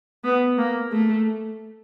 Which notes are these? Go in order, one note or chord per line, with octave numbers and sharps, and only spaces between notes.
B3
A#3
A3